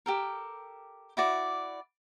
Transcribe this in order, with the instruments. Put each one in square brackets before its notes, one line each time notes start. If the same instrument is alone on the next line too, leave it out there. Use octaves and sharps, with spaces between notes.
[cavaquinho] G4 A4 A#4
E4 F#4 D5